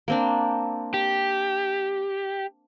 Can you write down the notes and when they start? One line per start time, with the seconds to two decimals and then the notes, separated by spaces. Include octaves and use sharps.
0.08 A#3 C4 D4
0.94 G4